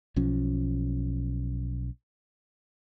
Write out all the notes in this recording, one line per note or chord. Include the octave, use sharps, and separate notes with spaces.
B1 F3 C#4